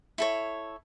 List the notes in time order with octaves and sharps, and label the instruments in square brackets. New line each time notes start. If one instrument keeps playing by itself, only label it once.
[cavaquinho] E4 A4 C#5